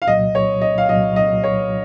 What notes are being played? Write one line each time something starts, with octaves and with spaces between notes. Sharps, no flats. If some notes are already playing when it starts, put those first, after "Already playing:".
F5
C2 A#2 F#3 D#5
C#5
D#5
F5
C2 A#2 F#3 D#5
D#5
C#5